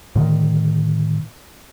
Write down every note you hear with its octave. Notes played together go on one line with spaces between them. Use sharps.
A2 D3 D#3